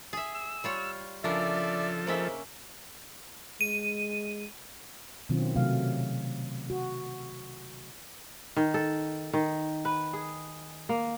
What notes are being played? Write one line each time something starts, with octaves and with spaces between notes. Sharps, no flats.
G#4 E5
E6
G3 F4 C#5
C#3 F3 D4 A4 A#4 D5 E5
C#3 A#3 C#4 D#4 C5 E5
G#3 D#7
B2 D#3 F#3 C4 C#4 F4
C3 F#3 A3 F5
F#4
D#3
A4
D#3
B4
G#4
A#3